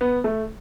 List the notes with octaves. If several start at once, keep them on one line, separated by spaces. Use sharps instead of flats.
B3
A3